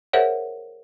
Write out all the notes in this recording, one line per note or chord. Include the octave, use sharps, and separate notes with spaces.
G#4 A#4 C5 C#5 E5 F#5